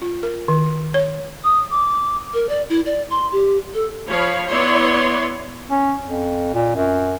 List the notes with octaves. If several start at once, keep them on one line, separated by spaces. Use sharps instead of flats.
F4
A#4
D#3
C#5
D#6
D6
A#4
D5
E4
D5
C6
G4
A4
F3 C#5 F5 B5
B3 E4 C#5 D5 C6
C#4
F2
A#2
F#2